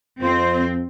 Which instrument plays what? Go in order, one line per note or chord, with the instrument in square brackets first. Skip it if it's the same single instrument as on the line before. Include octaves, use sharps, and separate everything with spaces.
[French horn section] F2 [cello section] C4 [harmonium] F4 C5